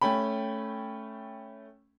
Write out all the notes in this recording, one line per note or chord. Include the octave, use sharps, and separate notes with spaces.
A3 C#4 G5 B5